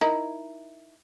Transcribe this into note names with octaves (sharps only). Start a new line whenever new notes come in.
D#4 E4 A#4